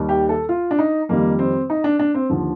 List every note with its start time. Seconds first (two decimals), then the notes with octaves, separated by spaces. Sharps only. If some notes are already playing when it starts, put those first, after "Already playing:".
Already playing: D#2 D#3 G3
0.09 G4
0.29 A4
0.49 F4
0.71 D4
0.79 D#4
1.09 F2 D#3 G3 A#3
1.39 C4
1.70 D#4
1.84 D4
1.99 D4
2.14 C4
2.29 D#2 D3 F3